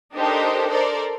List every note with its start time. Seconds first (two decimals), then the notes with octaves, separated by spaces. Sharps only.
0.14 D4 D#4 G4 A4 A#4 C5
0.70 A4 A#4 C5 D5